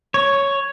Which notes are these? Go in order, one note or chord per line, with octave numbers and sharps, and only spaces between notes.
C#5